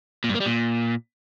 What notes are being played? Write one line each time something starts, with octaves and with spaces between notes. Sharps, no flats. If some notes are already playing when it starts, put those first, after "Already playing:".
A#2
G2
A#3
G3
A#2